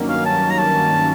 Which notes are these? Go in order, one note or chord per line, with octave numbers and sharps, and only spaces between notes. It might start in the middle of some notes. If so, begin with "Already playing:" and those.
Already playing: G2 D#3 F#3 A#3 C#4
F5
A5
A#5
A5